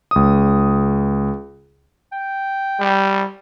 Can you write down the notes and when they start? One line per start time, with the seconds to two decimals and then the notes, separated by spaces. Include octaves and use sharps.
0.11 C#2 D#6
2.12 G5
2.80 G3